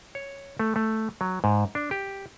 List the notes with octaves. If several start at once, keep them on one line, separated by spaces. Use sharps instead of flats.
C#5
A3
A3
F#3
G#2
D4
G4